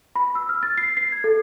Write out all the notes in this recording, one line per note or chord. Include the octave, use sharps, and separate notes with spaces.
B5
E6
F6
A6
C7
C7
G#6
A4